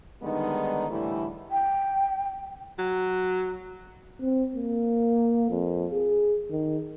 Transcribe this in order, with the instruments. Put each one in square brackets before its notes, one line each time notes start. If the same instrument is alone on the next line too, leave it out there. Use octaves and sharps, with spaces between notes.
[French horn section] D3 D#3 G3 G#3 B3 D#4
A2 D3 E3 G3 A3 E4
[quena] G5
[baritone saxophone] F#3
[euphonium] C4
A#3
F2
G#4
D#3